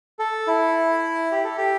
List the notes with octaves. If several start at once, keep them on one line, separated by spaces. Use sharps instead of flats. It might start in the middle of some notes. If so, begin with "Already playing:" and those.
A4
E4
G4
A4
G4